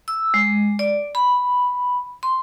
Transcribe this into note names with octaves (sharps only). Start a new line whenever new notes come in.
E6
G#3
D5
B5
C6